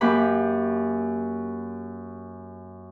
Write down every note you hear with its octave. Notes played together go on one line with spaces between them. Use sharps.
F#2 A#3 G4 B5